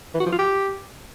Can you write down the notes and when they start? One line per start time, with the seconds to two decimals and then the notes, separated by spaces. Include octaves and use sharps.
0.14 E3
0.20 F#4
0.26 F3
0.32 F4
0.39 G4